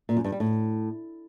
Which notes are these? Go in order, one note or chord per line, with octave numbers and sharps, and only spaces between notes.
A#2
F#2
G2
G3
A2